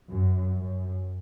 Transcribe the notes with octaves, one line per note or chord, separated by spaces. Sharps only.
F#2
F#2